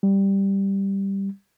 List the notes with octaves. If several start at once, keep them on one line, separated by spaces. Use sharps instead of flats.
G3